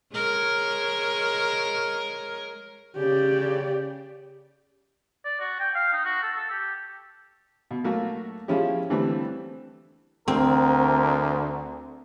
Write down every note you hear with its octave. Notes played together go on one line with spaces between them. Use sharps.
G#3 A#4 C#5
C#3 G4 D5
D5
F#4
G5
F5
D#4
F#4
A4
A4
G4
B2
F#3 A3 A#3 F#4
F3 G#3 C#4 E4 G4
D3 E3 G3 A3 C4
D2 C4 A#4